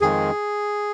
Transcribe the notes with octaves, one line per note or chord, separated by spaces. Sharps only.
F2 D#3 G#3 G#4